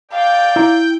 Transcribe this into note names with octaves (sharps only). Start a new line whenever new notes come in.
D5 F5 G5
E4 A#5